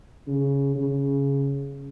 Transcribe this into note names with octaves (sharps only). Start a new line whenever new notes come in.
C#3
C#3